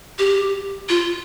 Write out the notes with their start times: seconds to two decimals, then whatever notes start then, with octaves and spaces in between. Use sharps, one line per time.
0.19 G4
0.89 F4